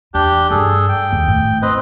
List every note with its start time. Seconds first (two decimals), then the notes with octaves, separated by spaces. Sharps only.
0.14 E2 D4 G4
0.51 G2 D4 G#4 A4
0.89 G5
1.12 D#2
1.28 A2
1.62 C4 B4 D#5